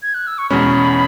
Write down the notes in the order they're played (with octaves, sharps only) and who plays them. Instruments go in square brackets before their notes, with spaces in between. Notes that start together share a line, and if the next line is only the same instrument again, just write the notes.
[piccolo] G#6
F#6
E6
C#6
[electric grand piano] E2 B2 G#3 C#4 [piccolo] B5